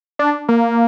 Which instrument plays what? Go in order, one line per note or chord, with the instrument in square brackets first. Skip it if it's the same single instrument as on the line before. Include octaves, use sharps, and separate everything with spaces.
[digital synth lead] D4
A#3